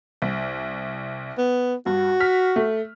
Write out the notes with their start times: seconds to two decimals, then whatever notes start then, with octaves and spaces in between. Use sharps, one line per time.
0.22 C2
1.38 B3
1.86 G2 F#4
2.20 F6 B6
2.56 A3